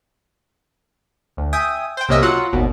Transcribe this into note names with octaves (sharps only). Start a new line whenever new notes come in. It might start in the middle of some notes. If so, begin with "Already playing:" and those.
D2
E5 G5 G#5 D#6
C5 G5
C2 C3 A#3 C#4 D#5 E5
F#3 F4 F#5
G#1 D#2 B2